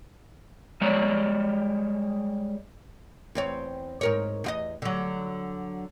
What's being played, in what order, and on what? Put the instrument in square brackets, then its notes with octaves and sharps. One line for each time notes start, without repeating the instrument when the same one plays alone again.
[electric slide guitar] G3 G#3 C#5 D5
[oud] E2 C4 C#5
G#2 A#4 C#5
E2 F4 D#5
D3 F#3